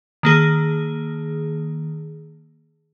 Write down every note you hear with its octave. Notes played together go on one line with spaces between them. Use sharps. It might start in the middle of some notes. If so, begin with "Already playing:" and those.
D#3 A#3 G#4